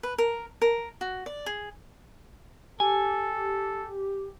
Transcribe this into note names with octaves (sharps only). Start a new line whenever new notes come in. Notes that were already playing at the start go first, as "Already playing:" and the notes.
B4
A#4
A#4
F#4
D5
G#4
G4 A4 G#5